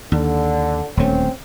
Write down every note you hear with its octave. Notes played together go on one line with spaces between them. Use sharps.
D#2 D3
D#1 D2 A3 C4 C#4